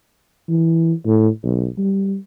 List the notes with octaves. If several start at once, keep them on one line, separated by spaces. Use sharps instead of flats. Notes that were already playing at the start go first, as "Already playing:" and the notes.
E3
A2
B1
G3